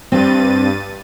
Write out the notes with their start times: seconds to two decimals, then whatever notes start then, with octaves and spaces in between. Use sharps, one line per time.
0.12 G2 C4 A6 D#7